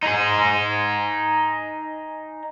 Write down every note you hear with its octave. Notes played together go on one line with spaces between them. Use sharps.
D#4 G#4